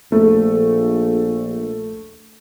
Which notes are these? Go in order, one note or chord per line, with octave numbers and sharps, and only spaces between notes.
A#1 A3